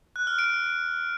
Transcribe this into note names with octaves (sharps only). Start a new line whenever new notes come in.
F#6
F6
D7